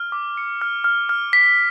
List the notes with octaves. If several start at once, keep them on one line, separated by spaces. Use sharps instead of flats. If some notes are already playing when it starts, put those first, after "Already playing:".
Already playing: F6
D6
C#7
F6
F6
F6
B6